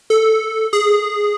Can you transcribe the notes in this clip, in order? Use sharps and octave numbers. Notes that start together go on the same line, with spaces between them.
A4
G#4